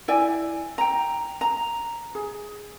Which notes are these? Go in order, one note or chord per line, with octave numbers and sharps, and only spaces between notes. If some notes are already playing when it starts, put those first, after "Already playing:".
E4 D5 G5 G#5
G5 A#5
A#5
G#4